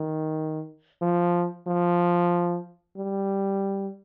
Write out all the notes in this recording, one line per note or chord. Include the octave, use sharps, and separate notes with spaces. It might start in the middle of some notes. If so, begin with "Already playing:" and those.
Already playing: D#3
F3
F3
G3